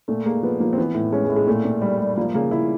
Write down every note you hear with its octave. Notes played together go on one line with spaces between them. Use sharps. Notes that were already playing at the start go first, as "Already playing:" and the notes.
A#2 A3
G#3 A#3
F3 B3
F3 A#3
C4
E3 B3
A2
G#3 C#4
G#3
A2
G#3
A#2 A3
A#2
G3
G3
F3 A#3
C#3 A#3
C#3 E4